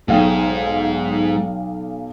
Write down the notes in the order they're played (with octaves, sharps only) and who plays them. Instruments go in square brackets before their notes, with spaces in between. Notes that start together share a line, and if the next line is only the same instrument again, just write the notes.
[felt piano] B1 F5 G5 [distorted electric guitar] G#2